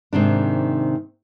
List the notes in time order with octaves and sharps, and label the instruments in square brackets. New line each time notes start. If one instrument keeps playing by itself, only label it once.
[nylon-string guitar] G#2 C3 D#3 D4